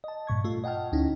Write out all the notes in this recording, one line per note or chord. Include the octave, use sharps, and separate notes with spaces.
D#5 A5
G2 A#2 C#6 G#6
A3 F4
D#5 F#5 G5 A5 F6
D2 C#4 D#4 E4